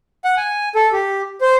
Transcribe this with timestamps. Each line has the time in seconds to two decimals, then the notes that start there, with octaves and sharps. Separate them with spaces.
0.24 F#5
0.37 G#5
0.75 A4
0.92 G4
1.41 C5